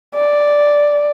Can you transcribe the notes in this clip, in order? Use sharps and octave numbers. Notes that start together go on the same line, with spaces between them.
D5